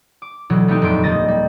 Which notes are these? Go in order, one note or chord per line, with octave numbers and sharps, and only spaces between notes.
D6
D2 B2 E3 F#3
A3 B3 C4 D#4 G4
D#1 F2 C6 D7
D#3 G3 D#5 A6 A#6
G3